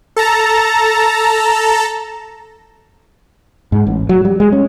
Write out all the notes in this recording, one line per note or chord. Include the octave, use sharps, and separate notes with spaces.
A4 A5 A#5
G#2
A1
F#3
G3
G#3
C#4